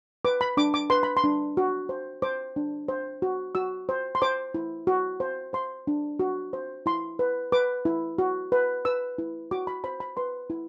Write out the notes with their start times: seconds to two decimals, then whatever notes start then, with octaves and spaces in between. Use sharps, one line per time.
0.25 B4 D6
0.41 B5
0.57 D4 D6
0.74 D6
0.90 B4 C6
1.03 B5
1.17 C6
1.24 D4
1.57 F#4
1.89 C5
2.22 C5 D6
2.56 D4
2.88 C5
3.22 F#4
3.55 F#4 E6
3.89 C5
4.15 C6
4.22 C5 D6
4.54 E4
4.87 F#4
5.20 C5
5.53 C5 C6
5.87 D4
6.19 F#4
6.53 C5
6.86 E4 C6
7.19 B4
7.52 B4 D6
7.85 E4
8.18 F#4
8.52 B4
8.85 B4 E6
9.18 E4
9.51 F#4 D6
9.67 B5
9.84 C5 B5
10.00 B5
10.17 B4 C6
10.50 E4